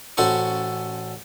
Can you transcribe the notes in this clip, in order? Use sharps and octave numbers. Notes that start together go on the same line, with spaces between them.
A1 C#4 F#4 A4 C5 C#6